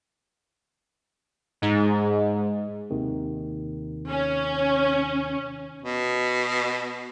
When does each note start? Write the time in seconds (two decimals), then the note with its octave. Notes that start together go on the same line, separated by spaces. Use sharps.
1.62 G#2
2.90 D#2 C3 D#3
4.09 C#4
5.82 B2